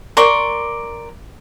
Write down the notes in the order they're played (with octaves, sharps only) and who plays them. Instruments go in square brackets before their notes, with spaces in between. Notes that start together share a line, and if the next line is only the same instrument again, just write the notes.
[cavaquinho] A#4 D5 C6 C#6